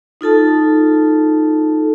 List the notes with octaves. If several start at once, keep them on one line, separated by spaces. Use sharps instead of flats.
D#4 F4 A4 A5